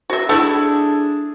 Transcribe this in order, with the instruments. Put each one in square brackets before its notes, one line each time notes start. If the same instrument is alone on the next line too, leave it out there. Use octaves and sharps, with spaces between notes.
[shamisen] F#4 E5
[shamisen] A3 E4 [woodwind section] D4 G#4